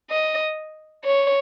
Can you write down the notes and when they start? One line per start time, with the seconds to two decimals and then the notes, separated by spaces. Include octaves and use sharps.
0.10 D#5
1.05 C#5